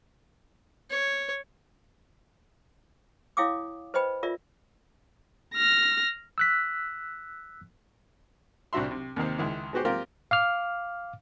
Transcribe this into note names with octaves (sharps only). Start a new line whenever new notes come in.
C#5
E4 C#5 F5 G5 D6 D#6
B4 C5 D#5 G5 B5
F4 A#4 D5 E5
F6 A#6
E6 F#6 B6
C2 C4 D4 F#4 E5 C6
C3
D#2 C3 D#3 C5
C#2 D#3 E4
G#3 B3 F#4 G4 C5
A#3 C4 F4 G4 A#4
F5 D6 F6